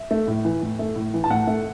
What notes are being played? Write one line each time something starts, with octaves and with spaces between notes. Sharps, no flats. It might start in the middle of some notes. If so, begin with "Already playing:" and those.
Already playing: E5
A3
A2
E3
A2
A3
A2
E3
A5
A2 F#5
A3